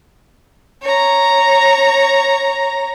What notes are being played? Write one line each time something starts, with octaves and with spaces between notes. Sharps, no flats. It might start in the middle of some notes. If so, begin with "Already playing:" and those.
C#5 A#5